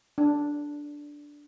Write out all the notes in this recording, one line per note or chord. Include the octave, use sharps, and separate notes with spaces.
D4